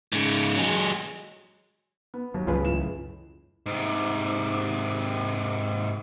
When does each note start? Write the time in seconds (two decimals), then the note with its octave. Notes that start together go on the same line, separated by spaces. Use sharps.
0.12 G#2 C#3
0.56 F#3 G#3
2.14 B3
2.34 D#2 F#3
2.47 C#2 F#2 C#3 E3 F4 G#4 B4
2.64 A2 E7
3.66 G#2 C3